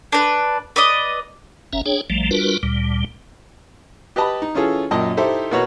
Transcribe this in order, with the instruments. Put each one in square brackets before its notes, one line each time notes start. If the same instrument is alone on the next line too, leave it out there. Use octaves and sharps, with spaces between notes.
[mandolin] D4 B4
B4 D5 D#5
[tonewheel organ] F#1 C#4 E5 A#5
D4 G#4 C#5 G5
A#1 F3 G3 A3
G3 D4 F4 F#4 A#4 B4
D2 A#2 G3
[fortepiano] G4 B4 D#5 A5 B5
D#4
E3 C#4 F4 G#4 A4
F#2 A#2 D#5 G5 A5
D#4 E4 G4 A4 C5 E5
B2 A#3 F#4 B4 C#5